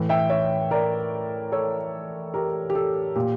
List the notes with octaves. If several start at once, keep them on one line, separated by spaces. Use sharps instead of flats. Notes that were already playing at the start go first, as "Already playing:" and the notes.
Already playing: A2 E3
E5 G5
C#5 E5
A#4 D5
A4 C#5
G4 A#4
G4
A4
A#2 G4